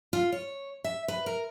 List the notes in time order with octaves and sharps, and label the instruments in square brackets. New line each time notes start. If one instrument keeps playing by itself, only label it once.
[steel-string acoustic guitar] F4
C#5
E5
B4
A#4